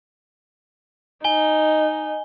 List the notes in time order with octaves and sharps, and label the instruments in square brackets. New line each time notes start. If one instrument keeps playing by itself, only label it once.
[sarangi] D#4 [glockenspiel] G#5 G7